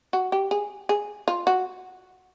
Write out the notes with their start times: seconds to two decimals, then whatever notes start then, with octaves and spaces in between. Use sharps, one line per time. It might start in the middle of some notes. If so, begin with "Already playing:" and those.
0.13 F#4
0.32 G4
0.51 G#4
0.89 G#4
1.28 F4
1.47 F#4